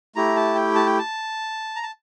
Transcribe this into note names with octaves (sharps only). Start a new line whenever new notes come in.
A3 E4 G4 A#5
A5
G5
A5
G5
A5
A#5
A5